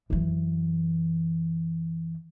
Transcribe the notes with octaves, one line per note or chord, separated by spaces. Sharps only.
F#2 E3